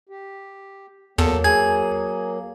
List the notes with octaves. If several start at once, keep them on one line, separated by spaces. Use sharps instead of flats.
G4
E2 F#3 A#3 A4
G#4 G#6